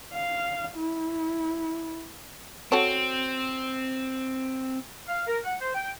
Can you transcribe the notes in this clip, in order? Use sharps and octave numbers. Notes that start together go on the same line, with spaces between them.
F5
E4
C4 F#4 A4 C#5
F5
A#4
F#5
C5
G5